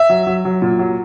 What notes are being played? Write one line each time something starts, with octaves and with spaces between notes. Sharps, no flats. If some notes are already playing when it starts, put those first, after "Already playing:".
Already playing: E5
F#3
F#3
F#3
A#2
F#3